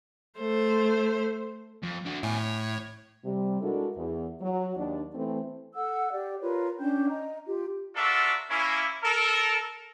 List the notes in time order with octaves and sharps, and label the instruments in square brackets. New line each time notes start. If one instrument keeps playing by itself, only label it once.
[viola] A3 C5
[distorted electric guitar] F2
D4 F#4
[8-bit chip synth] A2 [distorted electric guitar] B3 G#5
[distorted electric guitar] C#5
[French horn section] C3 G3
G#3 D4 E4 F#4 A4 A#4
E2
F#3
D#2 D4
E3 A3 C4
[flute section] A4 F#5 E6
G4 D5
F4 A#4 B4 C#5
C#4 D4 G5 G6
D#5 A#5
F4 G4
[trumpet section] D4 F4 F#4 A4 A#4 E5
A#3 C#4 E4
A4 A#4